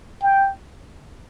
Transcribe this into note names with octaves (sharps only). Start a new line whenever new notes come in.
G5